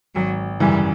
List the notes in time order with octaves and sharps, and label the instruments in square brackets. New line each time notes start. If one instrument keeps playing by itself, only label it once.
[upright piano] G#1 [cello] F#3
[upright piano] F#2 C#3 E3 [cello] G3